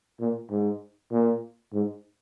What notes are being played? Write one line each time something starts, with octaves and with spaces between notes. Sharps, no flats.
A#2
G#2
A#2
G#2